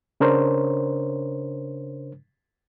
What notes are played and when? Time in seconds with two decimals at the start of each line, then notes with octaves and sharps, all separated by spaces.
0.20 C#3 D4 A#4 C5 C#5